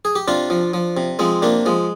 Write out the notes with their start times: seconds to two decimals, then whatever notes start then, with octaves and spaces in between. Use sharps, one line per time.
0.05 G#4
0.16 G4
0.28 C3 D4 F4
0.50 F3
0.74 F3
0.97 C3
1.19 F3 G#3 C4
1.42 C3 A#3 D4
1.66 F3 G#3